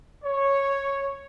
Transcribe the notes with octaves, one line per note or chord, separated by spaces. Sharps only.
C#5